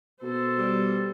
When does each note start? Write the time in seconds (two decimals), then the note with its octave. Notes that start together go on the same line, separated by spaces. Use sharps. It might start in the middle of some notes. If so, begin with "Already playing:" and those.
0.22 B2 A4 C5
0.58 G3